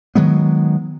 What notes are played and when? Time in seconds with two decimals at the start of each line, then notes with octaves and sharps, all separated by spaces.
0.15 D#3 F#3 G#3 B3